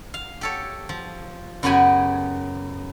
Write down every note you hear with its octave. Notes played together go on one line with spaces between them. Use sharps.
F5
G4 A4 C#5
F3
F#2 C#3 B3 F#4 G4 G#5